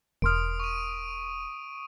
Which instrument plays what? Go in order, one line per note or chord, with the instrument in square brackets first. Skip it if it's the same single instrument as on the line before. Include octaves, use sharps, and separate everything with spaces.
[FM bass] E1 [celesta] A#4 C6 F6 [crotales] D#6 D7
[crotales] C#6 D#7